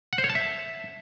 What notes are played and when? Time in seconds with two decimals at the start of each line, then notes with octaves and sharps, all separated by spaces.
0.13 F#5
0.18 C5
0.24 C#5
0.30 A5
0.35 E5